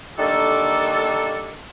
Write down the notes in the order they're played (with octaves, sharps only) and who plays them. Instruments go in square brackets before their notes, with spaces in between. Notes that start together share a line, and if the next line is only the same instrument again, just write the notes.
[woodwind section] D3 D#3 G3 A#3 D4 A4